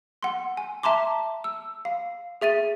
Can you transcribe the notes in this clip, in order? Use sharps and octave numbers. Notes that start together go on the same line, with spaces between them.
F#5 C6
G#5
E5 A5 A#5 C6 D6
E6
F5
G#4 E5 A6 D#7